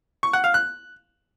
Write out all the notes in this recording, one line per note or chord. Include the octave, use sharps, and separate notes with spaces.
C#6
F#5
F5
F#6